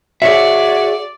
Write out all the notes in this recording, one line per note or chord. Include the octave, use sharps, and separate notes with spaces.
F#4 G#4 C#5 D5 E5